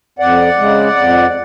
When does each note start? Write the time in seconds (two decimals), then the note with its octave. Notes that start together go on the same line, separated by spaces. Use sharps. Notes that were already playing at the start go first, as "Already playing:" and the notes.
0.19 F2 D5 F#5
0.58 C#3 G#3
0.96 F2